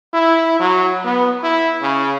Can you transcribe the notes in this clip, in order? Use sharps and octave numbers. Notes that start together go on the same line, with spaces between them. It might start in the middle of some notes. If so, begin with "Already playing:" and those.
E4
F#3
B3
E4
C#3